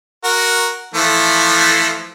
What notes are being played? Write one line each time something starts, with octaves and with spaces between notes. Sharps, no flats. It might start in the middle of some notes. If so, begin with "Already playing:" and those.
F#4 A#4
E3 F3 A3